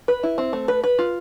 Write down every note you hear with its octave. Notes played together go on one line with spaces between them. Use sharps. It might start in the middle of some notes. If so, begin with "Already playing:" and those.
B4
E4
C4
A3
B4
B4
F4